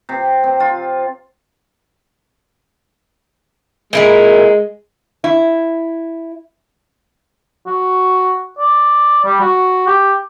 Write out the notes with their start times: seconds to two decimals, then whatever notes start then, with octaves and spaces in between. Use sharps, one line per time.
0.09 C3
0.44 C4
0.60 F4
3.93 A#2 G#3 E4 A#4
5.24 E4
7.67 F#4
8.59 D5
9.25 G3
9.41 F#4
9.87 G4